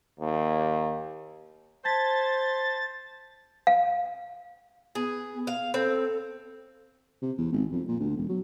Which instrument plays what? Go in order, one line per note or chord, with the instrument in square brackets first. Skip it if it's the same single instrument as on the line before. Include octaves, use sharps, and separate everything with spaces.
[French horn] D#2
[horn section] C5 [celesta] A5 G#6 B6 [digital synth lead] A6
[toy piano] F5
[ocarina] B3 [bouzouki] G#4
[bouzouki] F5
[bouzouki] C4 [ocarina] A4
[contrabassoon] C3
E2
G#1
F2
A#2
D2
E1
F#3